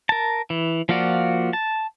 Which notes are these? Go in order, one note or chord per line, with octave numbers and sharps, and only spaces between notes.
A#4 A5
E3
F3 A#3 F4 F#4 D5
A5